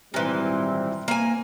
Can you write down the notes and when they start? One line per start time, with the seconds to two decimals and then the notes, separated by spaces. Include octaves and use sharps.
0.14 G#1 A#2 E3 G3 C4
1.08 A#3 G#5